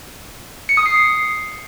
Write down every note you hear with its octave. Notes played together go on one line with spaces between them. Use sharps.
C#7
D#6
C7